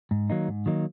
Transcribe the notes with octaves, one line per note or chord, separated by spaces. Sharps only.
G#2
D#3 F#3 A#3 D#4
G#2
D#3 F#3 A#3 D#4